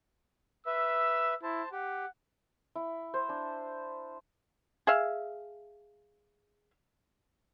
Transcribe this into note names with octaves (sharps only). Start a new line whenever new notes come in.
B4 E5 E6
E4 C5 A5
G4 F#5
E4
C5
D4
G#4 E5 F5